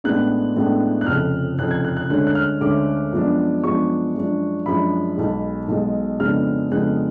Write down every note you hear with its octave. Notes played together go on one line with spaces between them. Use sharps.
A1 A2 G#3 B3 D4 F#6
A1 A2 G#3 B3 D4
F#6
F1 F2 C#3 F6
F1 F2 C#3 F#6
G#6
F#6
F#6
D2 D3 G#3 C#4 F#6
F#6
F6
D2 D3 G#3 C#4 D6
F#2 F3 G#3 B3 D4
F#2 F3 G#3 B3 D4 C#6
F#2 F3 G#3 D4
F#2 F3 G#3 D4 B5
B1 B2 G#3
B1 B2 G#3
F2 C#3 G#3 B3 D4 F6
F2 C#3 G#3 B3 D4 F#6